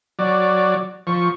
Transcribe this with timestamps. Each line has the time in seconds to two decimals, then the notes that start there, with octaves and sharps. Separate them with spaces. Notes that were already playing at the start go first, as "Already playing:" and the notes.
0.19 F#3 D5
1.07 F3 C#6